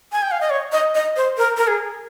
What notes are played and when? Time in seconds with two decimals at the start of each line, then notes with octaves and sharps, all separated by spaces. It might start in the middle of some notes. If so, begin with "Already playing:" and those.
0.12 G#5
0.22 G5
0.31 F5
0.41 D#5
0.50 C#5
0.72 D#5
0.95 D#5
1.16 C5
1.38 A#4
1.57 A#4
1.67 G#4